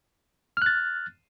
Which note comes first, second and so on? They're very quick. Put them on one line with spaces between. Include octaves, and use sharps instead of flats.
F6 F#6 A6